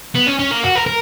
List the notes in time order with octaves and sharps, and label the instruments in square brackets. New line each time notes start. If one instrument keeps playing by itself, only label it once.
[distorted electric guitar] B3
C#4
C#4
A#3
F#4
A#4
A#4